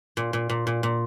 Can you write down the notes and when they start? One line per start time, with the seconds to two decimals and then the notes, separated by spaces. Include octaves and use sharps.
0.17 A#2
0.33 A#2
0.50 A#2
0.67 A#2
0.83 A#2